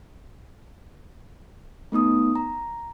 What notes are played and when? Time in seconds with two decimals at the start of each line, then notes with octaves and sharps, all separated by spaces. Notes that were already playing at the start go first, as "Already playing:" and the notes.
1.92 A3 B3 D#4 D#6
2.36 A#5